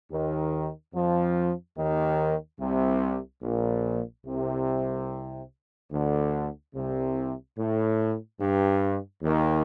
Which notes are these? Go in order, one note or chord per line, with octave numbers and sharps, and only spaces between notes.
D#2 D#3
F2 F3
D#2 D#3
C2 C3
A#1 A#2
C2 C3
D2 D3
C2 C3
A2
G2
D#2 D#3